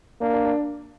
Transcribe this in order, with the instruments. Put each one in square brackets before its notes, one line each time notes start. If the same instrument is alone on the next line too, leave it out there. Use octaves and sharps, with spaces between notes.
[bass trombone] A#3 [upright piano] D4
[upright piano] D4
D4